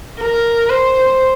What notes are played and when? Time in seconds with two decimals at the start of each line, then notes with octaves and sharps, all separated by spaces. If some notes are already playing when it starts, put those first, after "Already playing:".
0.20 A#4
0.70 C5